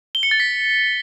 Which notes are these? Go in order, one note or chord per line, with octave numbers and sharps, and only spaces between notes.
G7
C#7
A6
B6